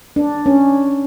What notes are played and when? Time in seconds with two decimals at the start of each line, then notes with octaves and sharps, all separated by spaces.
0.16 D4
0.46 C#4